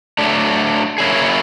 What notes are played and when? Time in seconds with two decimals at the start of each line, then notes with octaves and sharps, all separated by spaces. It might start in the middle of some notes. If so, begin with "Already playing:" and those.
0.18 F#3 A3 D4
0.98 F#3 A#3 C#4 E4 G#4